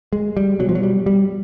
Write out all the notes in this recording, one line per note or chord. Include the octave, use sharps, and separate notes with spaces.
G#3
G3
B2 F#3
F3
F#3
G3
G3